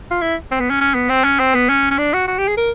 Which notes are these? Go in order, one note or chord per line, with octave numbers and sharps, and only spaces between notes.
F4
E4
C4
B3
C#4
C#4
B3
C4
C#4
C4
B3
C#4
C#4
D4
F#4
F#4
G4
G#4
A#4